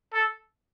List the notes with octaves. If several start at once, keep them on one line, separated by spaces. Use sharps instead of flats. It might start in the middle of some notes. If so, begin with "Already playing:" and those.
A4